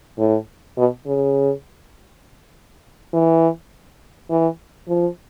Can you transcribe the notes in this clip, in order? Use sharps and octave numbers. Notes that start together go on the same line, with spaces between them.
A2
B2
C#3
E3
E3
F3